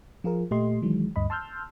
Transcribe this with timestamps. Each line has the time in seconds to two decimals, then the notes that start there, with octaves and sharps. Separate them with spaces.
0.24 F3 F4 G#4 A#4
0.51 A#2 A3 G4 D#5 C6
0.82 D#3 E3 F#3 G#3
1.16 D2 G2 D#5 B5
1.30 A5 C6 E6 F6 G6